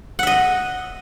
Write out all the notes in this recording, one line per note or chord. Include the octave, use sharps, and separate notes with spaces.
D#5 E5 F#5